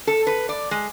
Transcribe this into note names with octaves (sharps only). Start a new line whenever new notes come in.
A4
B4
D5
G#3